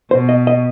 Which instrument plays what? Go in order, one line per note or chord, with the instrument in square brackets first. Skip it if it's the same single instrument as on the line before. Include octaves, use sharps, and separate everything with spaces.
[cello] B2 [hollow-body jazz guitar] C5
[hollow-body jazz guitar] D#5
D#5